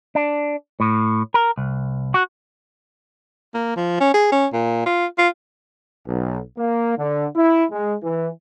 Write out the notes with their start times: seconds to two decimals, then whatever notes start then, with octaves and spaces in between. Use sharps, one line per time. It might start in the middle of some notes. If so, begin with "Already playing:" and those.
0.15 D4
0.80 A2
1.34 A#4
1.58 C2
2.14 F#4
3.54 A#3
3.76 F3
4.00 C#4
4.14 G#4
4.32 C#4
4.53 A#2
4.86 F4
5.18 F4
6.07 B1
6.58 A#3
6.97 D3
7.36 E4
7.71 G#3
8.02 E3